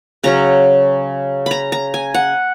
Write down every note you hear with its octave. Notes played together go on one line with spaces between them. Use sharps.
C#3 F#3 C#4 A#5
A#5 B5
A#5
G#5
F#5